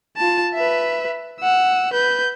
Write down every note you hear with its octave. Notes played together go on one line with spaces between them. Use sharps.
F4 A5
B4 E5
F#5 E6
B4 G6